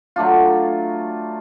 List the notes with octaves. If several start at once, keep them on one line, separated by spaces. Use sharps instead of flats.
F#3 A3 D4 F4